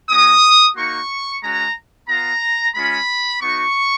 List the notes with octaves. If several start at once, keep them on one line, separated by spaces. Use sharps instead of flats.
G#3 C#4 F#4 D#6
A#3 D#4 F#4 C#6
G#3 C#4 F#4 A#5
B3 F4 A#5
G#3 C#4 F4 B5
B3 D#4 F#4 C#6